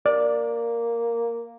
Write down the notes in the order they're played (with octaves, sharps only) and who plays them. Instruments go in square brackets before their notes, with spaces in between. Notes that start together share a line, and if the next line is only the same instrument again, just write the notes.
[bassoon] A#3 [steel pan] D5